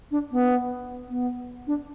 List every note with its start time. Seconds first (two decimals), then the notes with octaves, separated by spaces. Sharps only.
0.11 D4
0.32 B3
1.09 B3
1.67 D4